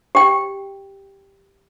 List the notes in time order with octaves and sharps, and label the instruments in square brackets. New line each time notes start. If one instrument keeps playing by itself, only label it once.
[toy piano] G4 G5